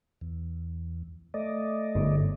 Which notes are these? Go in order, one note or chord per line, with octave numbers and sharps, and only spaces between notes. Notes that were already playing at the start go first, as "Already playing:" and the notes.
E2
A3 D5 D#5
G1